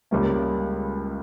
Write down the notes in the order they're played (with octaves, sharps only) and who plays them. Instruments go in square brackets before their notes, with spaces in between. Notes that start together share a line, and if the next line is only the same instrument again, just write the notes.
[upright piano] C#2 C#3 G3 A#3 C#4